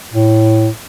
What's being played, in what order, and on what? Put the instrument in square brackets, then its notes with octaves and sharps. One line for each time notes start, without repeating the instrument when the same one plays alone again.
[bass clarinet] A2